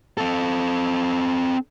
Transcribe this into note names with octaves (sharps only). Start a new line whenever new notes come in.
C4 A4